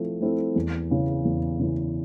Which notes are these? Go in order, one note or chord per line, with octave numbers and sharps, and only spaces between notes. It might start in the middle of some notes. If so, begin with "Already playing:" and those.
Already playing: F3 A3 C4 E4 A4
A3 C4 E4 A4
E2
C#3 E3
E2
C#3 E3